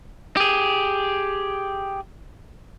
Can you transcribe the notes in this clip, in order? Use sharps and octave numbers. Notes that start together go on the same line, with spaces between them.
G4 G#4